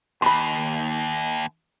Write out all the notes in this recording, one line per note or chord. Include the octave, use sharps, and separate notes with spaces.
D#2 B5 C6